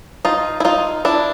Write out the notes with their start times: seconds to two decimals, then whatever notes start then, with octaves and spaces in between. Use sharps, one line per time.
0.25 D#4 F4
0.60 E4
0.65 D#4 F4
1.05 D4 E4